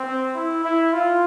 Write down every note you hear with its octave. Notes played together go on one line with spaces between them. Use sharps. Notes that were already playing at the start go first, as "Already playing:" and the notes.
Already playing: C4
E4
E4
F4